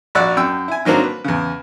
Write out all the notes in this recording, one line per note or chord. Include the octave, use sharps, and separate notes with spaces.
A#1 F#4 D5 C#6 E6 F#6
F#2 G5 E6
E4 G#5
D#3 F#3 A#3 C4 D4
B4
E2 C#3